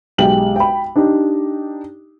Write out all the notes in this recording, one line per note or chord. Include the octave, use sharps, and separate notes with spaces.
B1 G#3 G4 G5 F#7
G5 B5
D4 D#4 G4